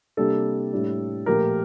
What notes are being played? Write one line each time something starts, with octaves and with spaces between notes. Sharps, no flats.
C3 G3 A#3 D4 A4
A2 G3 D4
A#2 F3 A3 G4 A#4